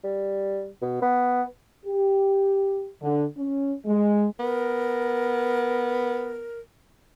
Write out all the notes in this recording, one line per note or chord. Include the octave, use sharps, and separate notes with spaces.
G3
B2
B3
G4
D3
C#4
G#3
B3 A#4